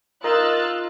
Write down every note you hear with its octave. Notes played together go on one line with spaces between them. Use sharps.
D#4 F4 A#4 E6 F#6 A6